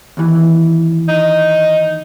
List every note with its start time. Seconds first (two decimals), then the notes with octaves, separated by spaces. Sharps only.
0.17 D#2 E3
1.09 D#4